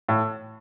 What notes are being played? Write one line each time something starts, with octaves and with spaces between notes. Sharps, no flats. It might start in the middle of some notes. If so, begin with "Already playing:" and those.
A2